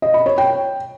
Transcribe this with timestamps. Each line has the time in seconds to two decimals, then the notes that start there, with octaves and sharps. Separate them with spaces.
0.02 D#5
0.14 B5
0.26 C#5
0.38 G5